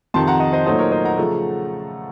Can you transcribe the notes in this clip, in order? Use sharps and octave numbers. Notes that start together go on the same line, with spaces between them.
F2 C3 D#3 A5 C6
F#5 A#5
D#5 F#5
C5 D#5
A#2 F#3 A3 D#4 C5 D#5
A#4 C#5
C5 D#5
F#5 A#5
C#3 F3 A3